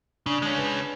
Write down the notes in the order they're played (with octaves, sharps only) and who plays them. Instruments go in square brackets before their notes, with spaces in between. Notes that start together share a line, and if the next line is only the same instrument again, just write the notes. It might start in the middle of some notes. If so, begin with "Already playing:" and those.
[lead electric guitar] C#3 [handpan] D4
[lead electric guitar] G#3 C#4
[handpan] B4